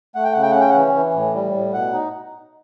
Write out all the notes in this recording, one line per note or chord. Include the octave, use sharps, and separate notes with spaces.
A3 F#5
G5
C#3 F#5
G5
C#4 F#5
G5
F#5
E3
E3
A2
G3
A2
B2 F#5
D#4